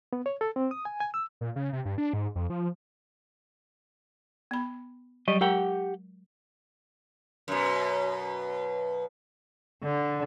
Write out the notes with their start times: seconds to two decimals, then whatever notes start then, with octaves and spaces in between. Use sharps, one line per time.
0.13 B3
0.26 C#5
0.41 A4
0.56 C4
0.71 D#6
0.85 G#5
1.00 G#5
1.14 E6
1.41 A#2
1.56 C#3
1.73 C3
1.85 G2
1.98 D4
2.14 G#2
2.35 F2
2.50 F3
4.51 B3 B5
5.28 F#3 G3 D#5
5.41 G#3 G4 A#4 F#5 G5 A#5
7.48 F#2 B2
9.84 D3